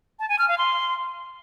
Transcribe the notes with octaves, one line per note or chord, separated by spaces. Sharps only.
A5
G#5
F6
F5
C6